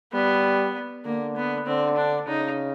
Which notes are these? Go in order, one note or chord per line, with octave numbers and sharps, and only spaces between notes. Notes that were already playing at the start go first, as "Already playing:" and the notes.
G3 B3
D3 A#3
B3
D3 C4
D4
C#3 D#4